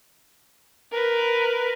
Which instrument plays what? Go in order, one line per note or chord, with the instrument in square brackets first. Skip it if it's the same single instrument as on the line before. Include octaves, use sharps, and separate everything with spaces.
[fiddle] A#4 B4